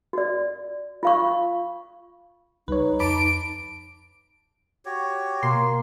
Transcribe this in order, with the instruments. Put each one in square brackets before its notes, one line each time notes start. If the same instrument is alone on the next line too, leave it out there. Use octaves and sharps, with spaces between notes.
[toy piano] F#4 D5
F4 F5 C#6
[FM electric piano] C#2 G3 [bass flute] D#4 [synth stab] B4 C#5
[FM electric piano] F2 [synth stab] A5 B5 D6 [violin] D7
[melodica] F#4 G4 C#5
[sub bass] B2 [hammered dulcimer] A#3 [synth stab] C6